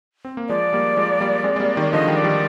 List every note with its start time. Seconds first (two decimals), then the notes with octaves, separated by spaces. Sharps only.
0.25 C4
0.37 A#3
0.49 F3 G#3 D5
0.73 G3 A#3
0.97 F3 G#3
1.20 G3 A#3
1.44 G#3 C4
1.56 G#3
1.60 G3 A#3
1.76 D#3 G3
1.92 D3 F3 D#5
2.08 D#3 G3
2.16 D5
2.24 D#3 G3